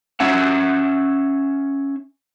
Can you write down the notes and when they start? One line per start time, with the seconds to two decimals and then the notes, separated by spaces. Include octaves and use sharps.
0.20 C#4 E5 F#5